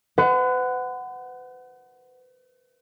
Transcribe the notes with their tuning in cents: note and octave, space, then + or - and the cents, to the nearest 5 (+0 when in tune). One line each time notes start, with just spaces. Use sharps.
B4 +45 F#5 +5